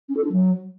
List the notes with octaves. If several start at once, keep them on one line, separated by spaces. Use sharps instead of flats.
C#4
A4
D4
F#3